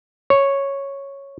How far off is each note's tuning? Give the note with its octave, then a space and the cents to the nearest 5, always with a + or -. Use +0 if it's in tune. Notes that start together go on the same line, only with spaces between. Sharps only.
C#5 -5